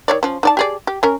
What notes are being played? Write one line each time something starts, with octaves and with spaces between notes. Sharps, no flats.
D#3 C#5 D5
F3 C#4
D#4 D5 A5
G4 G#4 D5
G4
C#4 A#4